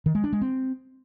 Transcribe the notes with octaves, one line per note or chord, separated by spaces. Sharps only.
D#3
G#3
D4
G#3
C4